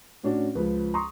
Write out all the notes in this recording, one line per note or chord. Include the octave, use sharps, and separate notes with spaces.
A2 C#4 D4 F#4
C#2 F3 B4
A#5 C6 C#6 D#6